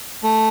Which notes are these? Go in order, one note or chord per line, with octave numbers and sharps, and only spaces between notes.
A3